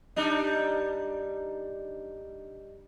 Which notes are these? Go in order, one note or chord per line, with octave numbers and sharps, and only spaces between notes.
G3 D4 D#4